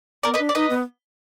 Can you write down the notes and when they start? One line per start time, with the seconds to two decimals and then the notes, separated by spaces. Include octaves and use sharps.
0.23 B3 A#4 D5
0.34 B4 D#5
0.39 D4
0.49 D5
0.55 D#4 B4 D#5
0.70 B3